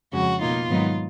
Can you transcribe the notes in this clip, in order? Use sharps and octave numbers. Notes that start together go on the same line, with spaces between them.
F2 C#3 G#3 C#4 F#4
B2 A#3 D#4 F4
G#2 D#3 F#3 B3 D#4